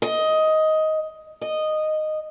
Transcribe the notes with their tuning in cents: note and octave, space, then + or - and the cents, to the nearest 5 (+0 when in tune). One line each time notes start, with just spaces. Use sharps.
D#5 +10
D#5 -10